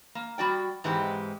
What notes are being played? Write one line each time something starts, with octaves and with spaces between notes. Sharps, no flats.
A#3
G3 F#4 D5 G5
G#2 E3 G#3 C4 G4